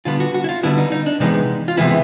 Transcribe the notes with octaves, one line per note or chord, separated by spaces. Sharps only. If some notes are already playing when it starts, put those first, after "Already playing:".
D3 G3 B3 F4
F#4
F#4
E4
F4
D3 G3 B3 E4
D#4
D#4
D4
C3 E3 G#3 B3 D#4
F4
C3 E3 G#3 B3 E4